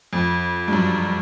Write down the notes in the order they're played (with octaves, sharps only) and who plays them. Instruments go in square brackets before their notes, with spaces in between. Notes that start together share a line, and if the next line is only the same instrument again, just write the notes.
[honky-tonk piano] F2
G2
F#2